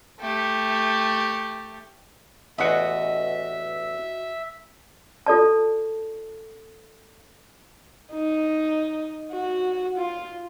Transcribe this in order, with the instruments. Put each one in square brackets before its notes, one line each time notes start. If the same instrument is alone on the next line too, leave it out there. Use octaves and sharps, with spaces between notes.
[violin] A3 G4
[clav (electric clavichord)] A1 E2 F#5 [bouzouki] F#4 D#5 [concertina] E5
[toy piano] F4 A4 D5 A5
[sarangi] D#4
F#4
F4